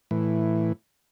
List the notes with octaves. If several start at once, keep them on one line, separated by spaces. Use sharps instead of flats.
A2 E3